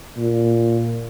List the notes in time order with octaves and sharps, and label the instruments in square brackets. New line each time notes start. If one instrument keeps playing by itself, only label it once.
[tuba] A#2